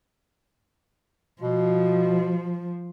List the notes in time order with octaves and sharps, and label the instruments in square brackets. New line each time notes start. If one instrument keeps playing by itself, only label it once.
[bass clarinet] B2 [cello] F3